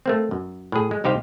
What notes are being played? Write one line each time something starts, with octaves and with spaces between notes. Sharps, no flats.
A3 A#3 C4
F#2
A2 G#4
G#3
C2 D#4 G4 C5 F5